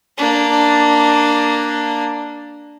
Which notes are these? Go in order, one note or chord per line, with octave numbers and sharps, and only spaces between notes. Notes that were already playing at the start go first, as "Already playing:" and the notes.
A#3 D4